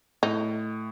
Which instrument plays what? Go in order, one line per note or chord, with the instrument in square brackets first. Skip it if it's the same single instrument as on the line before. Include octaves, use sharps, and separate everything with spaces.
[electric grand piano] A2 [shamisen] D#4